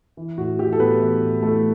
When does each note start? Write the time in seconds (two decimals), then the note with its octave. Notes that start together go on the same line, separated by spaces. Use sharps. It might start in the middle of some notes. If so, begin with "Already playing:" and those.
0.17 E3
0.38 A2 F#4
0.59 E3 G4
0.73 A4
0.80 A2 B3 B4
1.01 E3
1.22 A2
1.43 E3 A3 A4